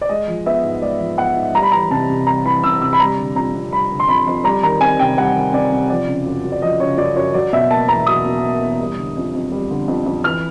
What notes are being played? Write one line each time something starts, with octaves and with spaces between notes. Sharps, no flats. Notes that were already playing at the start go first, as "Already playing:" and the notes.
D5
G#3 D#5
F3
B3 E5
G#2
G#3 D5
F3
B3 F#5
G#2
G3 A#5
B5
E3 A#5
C3 A5
C3
G3 A#5
E3 B5
C3 E6
C3 E6
B5
G3 A#5
D3
F2 A#5
F2
G3 B5
D3
C6
F2 B5
F2
G3 A#5
D#3 A#5
C4 G#5
C3 G5
G3 F#5
D#3
C4 D5
C3
F3 D5
C#3
F#2
F#2
D5
F3 D#5
C#3 C#5
F#2 D5
F#2 C#5
F#3 D5
B2 E5
A#3 A5
E2 A#5
F#3 D#6
B2
A#3
E2
G3
D3
F2
F2
G3
D3
F2
F2
E3 F6